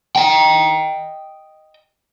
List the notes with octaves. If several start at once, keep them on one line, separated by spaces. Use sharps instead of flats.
D#5 G5